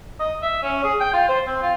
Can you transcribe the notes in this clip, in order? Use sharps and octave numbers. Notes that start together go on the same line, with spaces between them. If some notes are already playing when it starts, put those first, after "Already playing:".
D#5
E5
C#4
G#4
G5
F4
C5
C4
F4